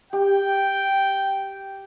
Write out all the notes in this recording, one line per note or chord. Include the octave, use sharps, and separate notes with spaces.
G4 G5